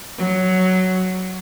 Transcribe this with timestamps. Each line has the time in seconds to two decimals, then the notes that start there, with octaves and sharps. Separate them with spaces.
0.17 F#3